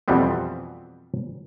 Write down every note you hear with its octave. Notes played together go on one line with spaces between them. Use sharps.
F2 B2 E3 G3 B3 C4